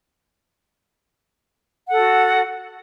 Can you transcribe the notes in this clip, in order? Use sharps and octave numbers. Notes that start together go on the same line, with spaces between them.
F#4 A4 F#5